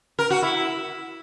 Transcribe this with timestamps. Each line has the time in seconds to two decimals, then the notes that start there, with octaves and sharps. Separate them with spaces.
0.19 A#4
0.30 F#4
0.42 E4